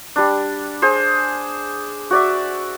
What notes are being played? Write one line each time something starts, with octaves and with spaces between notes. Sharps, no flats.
G3 D4
G#4 C5
F#4 D5 E5